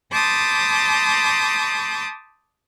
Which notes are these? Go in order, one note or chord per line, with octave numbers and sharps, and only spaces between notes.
A5 B5 C6 D6 D#6 G6